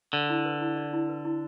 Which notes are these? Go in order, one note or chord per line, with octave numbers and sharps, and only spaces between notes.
D3 D5
E4
B4
E4
D5
E4
B4
E4